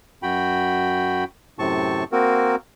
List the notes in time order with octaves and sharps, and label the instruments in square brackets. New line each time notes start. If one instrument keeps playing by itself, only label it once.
[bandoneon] F#2 F#4 G5 B5
F#2 A2 C3 C4 A5 C#6
A#3 C4 F#4 A#4